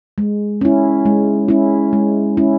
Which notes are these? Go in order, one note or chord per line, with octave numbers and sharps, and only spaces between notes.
G#3
C#4 E4
G#3
C#4 E4
G#3
C#4 E4